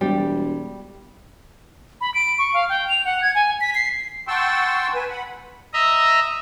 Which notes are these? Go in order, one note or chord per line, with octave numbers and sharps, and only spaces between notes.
E1 G3
B5
D7
C#6
F5
G5
F7
F#5
G#6
G#5
B6
C7
F#5 G5 A5 C6 C#6 E6
B4 G#5
F#5 B5
D#5 E5 A#5